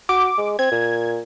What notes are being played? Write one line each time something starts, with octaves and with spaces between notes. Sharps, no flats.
F#4 D6
G#3
C4 G#6
A#2